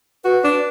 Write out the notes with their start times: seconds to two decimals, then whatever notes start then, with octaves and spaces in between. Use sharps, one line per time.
0.25 F#4 B4
0.44 D4